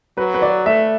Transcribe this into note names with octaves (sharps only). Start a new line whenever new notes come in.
F#3 B4
B4
D5
A3 E5